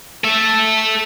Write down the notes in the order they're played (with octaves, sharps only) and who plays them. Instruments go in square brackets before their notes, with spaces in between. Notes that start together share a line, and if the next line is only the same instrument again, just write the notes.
[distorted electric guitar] A4 E5